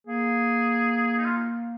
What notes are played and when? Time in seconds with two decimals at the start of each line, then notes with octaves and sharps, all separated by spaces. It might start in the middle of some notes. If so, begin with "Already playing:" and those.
0.07 A#3 G#4
1.18 D#4
1.25 F4